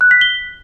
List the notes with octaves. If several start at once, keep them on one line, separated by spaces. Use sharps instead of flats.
F#6
B6
G7